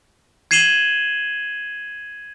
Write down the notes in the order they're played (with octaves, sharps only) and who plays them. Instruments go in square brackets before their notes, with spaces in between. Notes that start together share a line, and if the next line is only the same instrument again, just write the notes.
[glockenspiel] G#6 C7 D#7 E7 F#7 G7